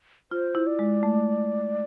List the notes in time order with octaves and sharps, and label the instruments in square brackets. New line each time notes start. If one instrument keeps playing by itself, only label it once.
[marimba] F4 [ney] C5
[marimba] E4
[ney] D5
[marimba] G#3
A3